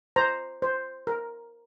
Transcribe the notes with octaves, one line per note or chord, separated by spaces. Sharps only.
C5 A#5
C5
A#4